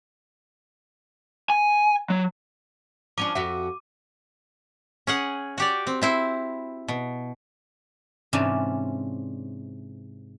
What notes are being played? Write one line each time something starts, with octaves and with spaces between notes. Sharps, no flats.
G#5
F#3
F3 C#4 D4 D6 D#7
F2 F#4 E5
C#4 G#4 F#5
F#4 G4 D5
C4
C4 E4 C5
B2
G#2 C3 E3 C#4 D4 F4